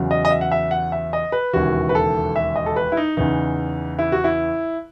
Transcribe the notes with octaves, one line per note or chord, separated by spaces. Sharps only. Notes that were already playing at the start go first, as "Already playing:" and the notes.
Already playing: E2 C#3 F#3
D#5
D#5
E5
F#5
E5
F#5
E5
D#5
B4
E1 D#2 C#3 E3 F#4
B4
A4
E5
D#5
A4
B4
E4
D#4
E2 C#3 E3 D#4
E4
F#4
E4